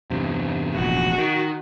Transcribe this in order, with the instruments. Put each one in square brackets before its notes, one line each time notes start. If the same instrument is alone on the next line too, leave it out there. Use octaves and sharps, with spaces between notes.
[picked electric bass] E2 G2 C3
[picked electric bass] F1 A#1 E2 [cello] F#4
[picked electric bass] D#3